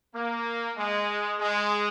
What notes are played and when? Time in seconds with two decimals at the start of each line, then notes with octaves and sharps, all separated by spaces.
0.14 A#3
0.77 G#3
1.39 G#3